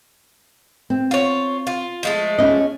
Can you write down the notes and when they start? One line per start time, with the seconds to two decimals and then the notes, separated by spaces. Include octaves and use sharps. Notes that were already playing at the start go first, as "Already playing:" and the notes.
0.90 C4
1.11 F4 C#5
1.67 F4
2.03 F3 G#3 A3
2.39 C#4 D#5